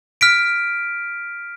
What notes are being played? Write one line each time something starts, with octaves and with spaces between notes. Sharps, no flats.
F6 B6 D7